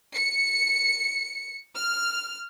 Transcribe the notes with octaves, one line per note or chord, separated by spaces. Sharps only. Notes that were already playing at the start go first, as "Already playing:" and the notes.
C#7
F6